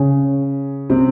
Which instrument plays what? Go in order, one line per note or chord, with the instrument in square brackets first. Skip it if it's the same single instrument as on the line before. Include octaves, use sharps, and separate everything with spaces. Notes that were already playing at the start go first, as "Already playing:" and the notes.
Already playing: [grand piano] C#3 C#4
C3 C4